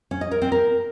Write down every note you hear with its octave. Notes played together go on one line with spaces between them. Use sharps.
C#4
D#5
A#4
C4
A#4